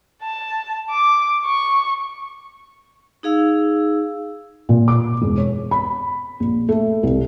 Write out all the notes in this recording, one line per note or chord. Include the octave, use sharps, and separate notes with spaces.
A5
D6
C#6
D#4 G#4 F5 E6
A#2
D6
E1
C#5
B5
A#1
A3
C2